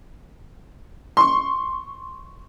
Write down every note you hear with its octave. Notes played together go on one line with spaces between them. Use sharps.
C6 C#6